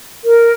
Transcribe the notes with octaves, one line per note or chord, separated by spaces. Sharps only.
A#4